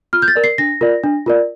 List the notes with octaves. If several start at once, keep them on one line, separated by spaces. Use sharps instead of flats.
F4 F6
G6
A6
A#4 D5
C7
D4 A#6
F4 A#4 D5
D4
F4 A#4 D5